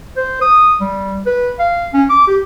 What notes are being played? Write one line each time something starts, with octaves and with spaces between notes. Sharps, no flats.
C5
D#6
G3
B4
F5
C#4
D6
G4